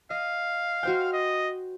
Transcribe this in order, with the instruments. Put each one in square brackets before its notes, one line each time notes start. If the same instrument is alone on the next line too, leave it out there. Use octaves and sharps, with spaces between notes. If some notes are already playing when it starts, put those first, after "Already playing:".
[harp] D#5 [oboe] F5
[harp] F#4 C5 G5 [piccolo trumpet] F6
[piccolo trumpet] D#5